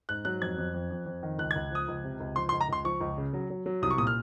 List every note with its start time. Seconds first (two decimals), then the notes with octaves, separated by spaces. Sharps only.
0.09 G#2 F#6
0.25 F#3 F#6
0.41 F2 G#6
0.58 F2
0.74 F2
0.91 F2
1.06 F2
1.23 D#3
1.38 C#2 F#6
1.51 G#6
1.56 C#2
1.71 F3 D#6
1.88 C#2
2.04 C3
2.20 C#2
2.36 F3 C6
2.49 C6
2.52 C#2
2.61 A#5
2.69 C#2 C6
2.85 F3 C#6
3.01 C#2
3.17 C#3
3.33 F#3
3.50 F#3
3.66 F#3
3.82 C2 D#6
3.91 C#6
3.98 A#2 D#6
4.07 F6